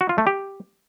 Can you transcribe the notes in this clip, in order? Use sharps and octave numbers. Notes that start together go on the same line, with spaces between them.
F#4
F4
A3
G4